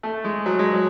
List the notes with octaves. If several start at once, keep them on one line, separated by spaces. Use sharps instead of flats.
A3
G#3
F#3
G#3
F#3